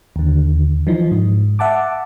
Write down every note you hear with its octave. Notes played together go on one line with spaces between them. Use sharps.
D#2 D3
E3 F3 D#4
G#2
E5 F#5 A5 D6